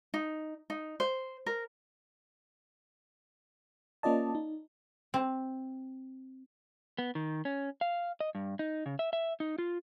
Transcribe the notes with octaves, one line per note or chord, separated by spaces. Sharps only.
D#4
D#4
C5
A#4
A#3 C#4 F4 D5 D#5 A5
D#4
C4
B3
D#3
C#4
F5
D#5
G2
D#4
C#3
E5
E5
D#4
F4